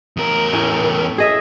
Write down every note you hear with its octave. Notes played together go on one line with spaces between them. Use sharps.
E2 A#4
A2 C#4
G#4 D#5 E5